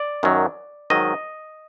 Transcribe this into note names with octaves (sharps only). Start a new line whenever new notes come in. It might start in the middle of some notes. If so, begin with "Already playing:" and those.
Already playing: D5
F#2 D#3 F#3
G#2 D#3 F#3 D#5